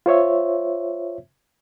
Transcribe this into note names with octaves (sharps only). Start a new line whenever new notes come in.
F4 C5 C#5 E5